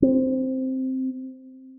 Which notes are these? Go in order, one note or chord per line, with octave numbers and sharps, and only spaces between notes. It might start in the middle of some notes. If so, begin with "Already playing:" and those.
C4